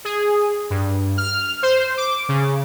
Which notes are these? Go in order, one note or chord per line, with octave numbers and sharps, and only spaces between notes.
G#4
G2
F6
C5
D6
C#3